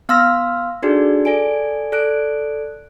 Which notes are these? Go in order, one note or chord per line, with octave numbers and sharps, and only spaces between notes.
B3 F5 C6 E6 F6 A#6
D4 D#4 F#4 G#4 A4 D5
A4 D5 G#5 D7
A4 D5 F#6 D7